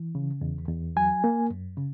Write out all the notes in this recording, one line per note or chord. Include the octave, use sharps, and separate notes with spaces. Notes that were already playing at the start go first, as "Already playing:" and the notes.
Already playing: E3
C#3
E2
E2
F#3 G#5
A#3
F#2
C#3